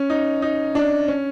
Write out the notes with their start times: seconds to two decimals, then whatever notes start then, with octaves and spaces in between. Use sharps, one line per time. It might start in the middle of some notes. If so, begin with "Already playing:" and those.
Already playing: C#4
0.10 D#4
0.42 D#4
0.75 D4
1.08 C#4